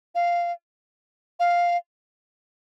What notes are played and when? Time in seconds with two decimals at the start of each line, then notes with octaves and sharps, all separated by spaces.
0.15 F5
1.40 F5